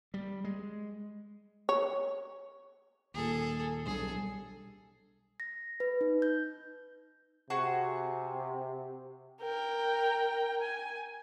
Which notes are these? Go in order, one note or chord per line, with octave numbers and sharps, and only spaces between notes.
G3
G#3
C#5
D#2 A#2 G#4 A4
B1 G3 D4 G#4 A4
A#6
B4
D#4
G6
C3 F#4 G#4 C#6
A#4 G5
G#5